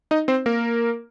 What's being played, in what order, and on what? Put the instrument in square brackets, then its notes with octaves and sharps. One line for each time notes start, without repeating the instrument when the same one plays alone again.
[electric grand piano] D#4 D#5
C4 C5
A#3 A#4